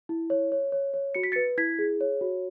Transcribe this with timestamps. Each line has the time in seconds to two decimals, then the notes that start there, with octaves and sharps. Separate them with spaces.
0.09 E4
0.30 C#5
0.52 C#5
0.72 C#5
0.94 C#5
1.15 F#4 C#7
1.23 B6
1.32 A6 C#7
1.36 B4
1.58 E4 G#6 B6
1.79 G#4
2.01 C#5
2.21 F#4